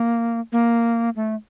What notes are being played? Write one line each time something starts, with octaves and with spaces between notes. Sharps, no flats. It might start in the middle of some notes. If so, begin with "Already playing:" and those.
Already playing: A#3
A#3
A3